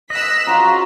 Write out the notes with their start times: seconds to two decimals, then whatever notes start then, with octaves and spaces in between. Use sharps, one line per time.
0.10 D#5 E6 F#6 B6
0.47 C#4 F4 F#4 C5 A#5